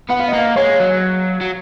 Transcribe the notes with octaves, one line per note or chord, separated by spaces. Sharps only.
B3 F#5
F5
D#5
A#3 F5
G#3 C#5
F#3
F#3